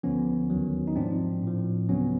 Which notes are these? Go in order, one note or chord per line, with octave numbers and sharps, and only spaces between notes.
D2 D3 F3 B3 C#4
D#2 D#3 F#3
D#4
G#2 F3 C4 D4
A2 F3
D2 C#3 F#3 B3 C#4